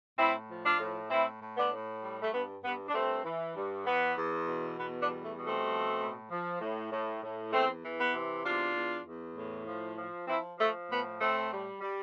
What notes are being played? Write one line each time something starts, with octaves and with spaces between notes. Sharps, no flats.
A2 C4 E4
F3
D4 F4
A2
A2 C4 E4
A2
B3 D4
A2
G3
A3
G2 B3
G2 B3
D4
G2 A3 C4
E3
G2
E2 B3
E2
B2
E2 B3
B3 D4
G3
A3
B2
A3 C4
F3
A2
F3
A2
A2
A2
E2 A3 C4
E3
B3
C3
E2 D4 F4
E2
E2
A2
F3
F3
F3 C4 E4
F3 A3
A2 B3
A2 A3 C4
G3
G3